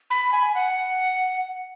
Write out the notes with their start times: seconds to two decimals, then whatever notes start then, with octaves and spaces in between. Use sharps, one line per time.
0.10 B5
0.32 G#5
0.55 F#5